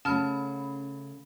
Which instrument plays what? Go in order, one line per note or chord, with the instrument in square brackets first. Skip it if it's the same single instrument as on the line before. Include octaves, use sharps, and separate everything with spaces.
[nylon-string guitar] C#3 A3 [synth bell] C#4 B5 [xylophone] A5 F6